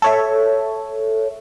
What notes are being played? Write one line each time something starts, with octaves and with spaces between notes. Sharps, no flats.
A4 C#5 E5